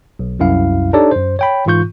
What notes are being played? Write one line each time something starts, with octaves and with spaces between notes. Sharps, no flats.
B1
C2 F#2 E4 F5
D4 D#4 G4 A4 C#5 D5
F#2 C5
C#5 G5 B5
G#2 E3 F4 C#6 G6